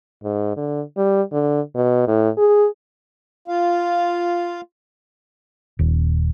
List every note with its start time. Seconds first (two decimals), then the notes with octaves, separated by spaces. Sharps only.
0.24 G#2
0.57 D3
0.97 G3
1.32 D3
1.75 B2
2.07 A2
2.38 G#4
3.48 F4 F5
5.79 D#1